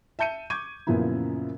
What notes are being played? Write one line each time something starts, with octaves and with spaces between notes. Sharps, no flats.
E5 A5 G6 C#7 D#7
C#6 D6 G6 G#6 D#7
F#2 A#2 C#3 F3 B3 E4